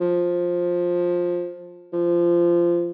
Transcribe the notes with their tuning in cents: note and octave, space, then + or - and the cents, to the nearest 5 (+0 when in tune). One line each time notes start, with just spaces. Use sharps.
F3 +10
F3 -20